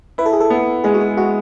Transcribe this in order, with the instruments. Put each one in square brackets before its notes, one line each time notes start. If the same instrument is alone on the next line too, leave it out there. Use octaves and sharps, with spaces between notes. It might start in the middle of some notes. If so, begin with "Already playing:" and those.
[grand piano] E4 [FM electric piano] B4
[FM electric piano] A4
G#4
A4
[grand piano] B3
[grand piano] G#3 [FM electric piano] G#4
[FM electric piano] F#4
G#4
[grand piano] G#3 [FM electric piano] F#4